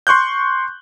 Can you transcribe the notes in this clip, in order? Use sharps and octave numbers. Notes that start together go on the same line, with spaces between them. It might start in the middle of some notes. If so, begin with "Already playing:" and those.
C6 C#6 F#6 G6